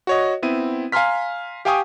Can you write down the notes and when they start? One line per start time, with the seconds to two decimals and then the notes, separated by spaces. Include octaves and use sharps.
0.07 F#4 C#5 D#5
0.42 B3 C4 E4 D#7
0.92 F5 G#5 A#5 C6 F6 B6
1.65 G4 F5 G5 G#5 C#6 D#6